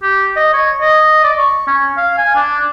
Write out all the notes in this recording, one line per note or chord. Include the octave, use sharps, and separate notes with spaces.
G4
D#5
C#5
D#5
D5
C#6
C#4
F5
G#5
D4